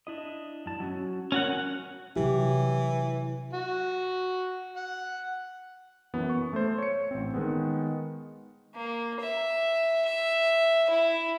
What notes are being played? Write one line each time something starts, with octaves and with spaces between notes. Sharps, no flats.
D4 E4 D#5
F#2 A5
F#3 C#4 F#4
C#4 F#4 A#4 F#5
C3 E3 F#3 G4
F#4
F#5
F#2 E3 B3
C#6
A3 C5
C#5 C#7
A1 C4
D#3 G#3 B3
A#3
E5
E5
E4